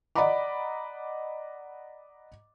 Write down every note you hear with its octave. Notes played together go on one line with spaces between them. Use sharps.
D5 D#5 F#5 A#5 B5 D6